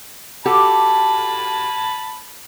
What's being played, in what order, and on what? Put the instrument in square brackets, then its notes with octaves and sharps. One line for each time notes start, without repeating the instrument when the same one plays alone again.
[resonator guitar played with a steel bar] F#4 G4 A4 [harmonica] A5 B5